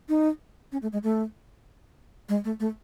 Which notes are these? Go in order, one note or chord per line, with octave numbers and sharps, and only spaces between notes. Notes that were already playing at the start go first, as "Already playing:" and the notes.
D#4
C#4
A3
G#3
A3
G#3
A3
A3